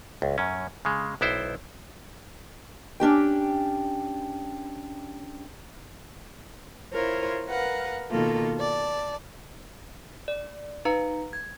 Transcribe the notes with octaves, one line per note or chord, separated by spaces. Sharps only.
C#2
F#2 C#4
C#3 G#3
B1 B3 E4 C5 G5
C#4 D4 G4 G5
E4 F4 A#4 C5 C#5
A#4 B4 F5 F#5
B2 D#3 A#3 F4 A4
D5 A5
D5
D#4 B4 F5 A#5 C#7
G#6